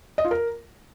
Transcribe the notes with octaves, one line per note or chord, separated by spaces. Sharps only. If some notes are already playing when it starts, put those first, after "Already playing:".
D#5
F4
A#4